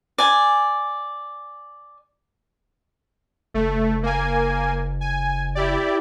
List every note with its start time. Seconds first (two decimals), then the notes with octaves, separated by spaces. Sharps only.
0.18 D5 G#5
3.54 F#1 A3
4.03 A#3 G#5
5.01 G#5
5.55 E4 G4 D5